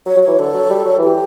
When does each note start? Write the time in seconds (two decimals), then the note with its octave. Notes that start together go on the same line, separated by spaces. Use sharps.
0.06 F#3 C#5
0.17 F#3
0.23 E3 C#5
0.39 D3 A4
0.54 F#3
0.71 G3
0.85 F#3
0.99 E3
1.04 G4